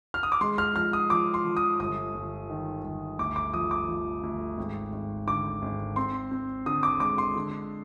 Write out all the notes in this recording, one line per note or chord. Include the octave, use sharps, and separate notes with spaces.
F6
D#6
D6
G#3 C6
F6
F3 F6
D#6
F3 D6
C6
F3
D#6
G1 D#6
G1
D#3
G1
D2 D6
D6
F3 D#6
D6
F3
D2
G#1
G#1
D3 D6
G#1
C4 C6
C4
D3 D#6
D6
G#3 D6
C6
D3